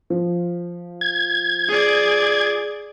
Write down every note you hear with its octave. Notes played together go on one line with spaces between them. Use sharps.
F3
G#6
G#4 D5